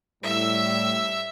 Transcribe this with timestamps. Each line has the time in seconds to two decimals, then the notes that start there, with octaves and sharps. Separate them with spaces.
0.23 A2 G3 E5 E6